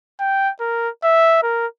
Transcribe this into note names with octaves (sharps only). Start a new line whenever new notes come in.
G5
A#4
E5
A#4